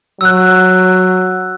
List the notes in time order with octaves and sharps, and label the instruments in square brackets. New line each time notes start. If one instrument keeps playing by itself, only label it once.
[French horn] F#3 [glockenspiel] E6 F#6